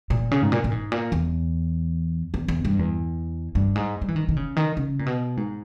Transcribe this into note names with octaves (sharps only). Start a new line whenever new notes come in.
A#2
C#3
G#2
A#2
A#2
G#2
A#2
E2
E2
E2
G2
E2
G2
G#2
G3
E3
D#3
D#3
C#3
D#3
C#3
A#2
B2
G#2